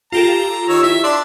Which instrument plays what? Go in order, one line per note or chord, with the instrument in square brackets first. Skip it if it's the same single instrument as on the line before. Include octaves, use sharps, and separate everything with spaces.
[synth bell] F4 G4 A4 [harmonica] A#5
[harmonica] D#3 C#5 E6
[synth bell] E4 [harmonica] E5
[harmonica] D4 D5 [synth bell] C6